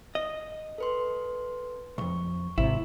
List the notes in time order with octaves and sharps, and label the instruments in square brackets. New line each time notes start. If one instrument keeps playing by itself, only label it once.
[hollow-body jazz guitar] D#5
[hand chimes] A4 B4 C6
[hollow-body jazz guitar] C2 F2 [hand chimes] C#6
[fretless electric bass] G#1 C3 [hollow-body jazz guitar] E4